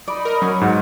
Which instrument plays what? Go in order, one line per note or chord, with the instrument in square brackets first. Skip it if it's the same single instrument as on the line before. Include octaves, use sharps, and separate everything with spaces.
[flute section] D#4 B5 D#6 [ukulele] D5
[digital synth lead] A#4
[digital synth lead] F#3 [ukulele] C#4
[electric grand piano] G#2 [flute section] B4 F#5